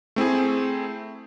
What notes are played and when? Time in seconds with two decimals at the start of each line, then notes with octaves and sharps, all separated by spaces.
0.16 A3 C4 E4 G#4